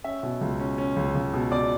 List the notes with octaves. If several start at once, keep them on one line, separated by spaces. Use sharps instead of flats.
C#4 E5
B2
C#2
C#4
C#4
C#2
C#2
B2
B2 D5